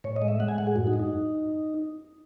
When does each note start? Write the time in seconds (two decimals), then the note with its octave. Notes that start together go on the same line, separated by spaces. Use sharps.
0.04 A2 C#5
0.16 D#5
0.22 G#3
0.28 E5
0.40 G#3 F#5
0.48 G#5
0.58 A2 F#5
0.67 G#4
0.76 F#2 F#4
0.87 D#4
0.93 F#2
0.99 D#4